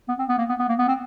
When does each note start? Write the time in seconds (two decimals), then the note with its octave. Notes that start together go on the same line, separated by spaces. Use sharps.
0.09 B3
0.19 C4
0.29 B3
0.38 A#3
0.49 B3
0.59 B3
0.69 A#3
0.79 B3
0.88 C4